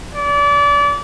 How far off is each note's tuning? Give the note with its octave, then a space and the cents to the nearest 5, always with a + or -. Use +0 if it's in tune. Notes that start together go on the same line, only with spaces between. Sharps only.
D5 -30